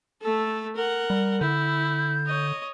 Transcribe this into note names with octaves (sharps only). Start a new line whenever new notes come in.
A3 A4
A#4 F#5
G3
D3 E4 G6
C#5 D#5